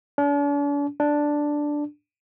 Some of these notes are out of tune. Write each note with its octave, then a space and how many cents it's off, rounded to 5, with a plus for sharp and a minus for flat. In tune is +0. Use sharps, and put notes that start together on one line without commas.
D4 -45
D4 +0